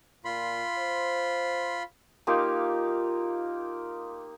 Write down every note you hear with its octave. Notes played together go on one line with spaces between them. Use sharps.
A#2 F4 B5 C6
C5
A#3 D#4 F4 G4